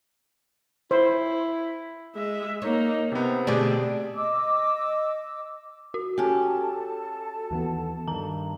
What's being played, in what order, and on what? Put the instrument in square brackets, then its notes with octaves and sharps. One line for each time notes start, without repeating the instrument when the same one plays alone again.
[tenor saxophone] E4 [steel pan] C5
[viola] G#3 E5
[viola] A#3 D#4 [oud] C#5
[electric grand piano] C3 B3 [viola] C4
[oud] B2 D3 A3 [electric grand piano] G4 G#4 D5
[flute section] D#5 D6 E6
[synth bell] F#4
[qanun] C#4 G4 [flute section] A4 A5
[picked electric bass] D#2 E3 B3
[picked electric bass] G2 D#3 [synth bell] A#5